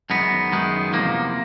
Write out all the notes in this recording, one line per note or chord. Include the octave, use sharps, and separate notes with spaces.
F#2 D#3 G#3 B3
F#2 D#3 G#3
E2 C3 F3 A#3